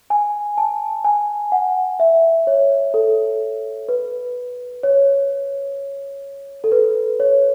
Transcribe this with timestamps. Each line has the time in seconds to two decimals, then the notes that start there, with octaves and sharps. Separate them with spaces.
0.10 G#5
0.58 A5
1.05 G#5
1.52 F#5
2.00 E5
2.47 C#5
2.94 A4
3.89 B4
4.83 C#5
6.64 A4
6.72 B4
7.20 C#5